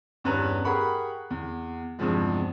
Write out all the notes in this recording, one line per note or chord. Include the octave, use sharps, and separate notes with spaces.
E2 G2 C#4 B4 A#5 F#6
G4 G#4 A#4 F#5 B5 C#6
E2
E2 G2 C3 F3 G#3